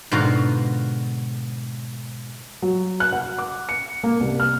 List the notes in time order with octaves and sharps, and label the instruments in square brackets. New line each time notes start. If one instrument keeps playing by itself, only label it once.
[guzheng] G#2 B2 D3 F4 F#4 A#5
[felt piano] F#3
F#6
F#5
D6
C#7
A#3
C2
F6